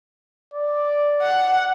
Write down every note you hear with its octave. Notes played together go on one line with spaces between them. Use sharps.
D5
F#5